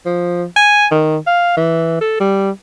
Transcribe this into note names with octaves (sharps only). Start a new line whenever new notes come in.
F3
G#5
D#3
F5
E3
A4
G3